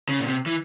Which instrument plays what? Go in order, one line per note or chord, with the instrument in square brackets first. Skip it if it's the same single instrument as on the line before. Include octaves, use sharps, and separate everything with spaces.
[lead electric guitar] C#3
A#2
C3
E3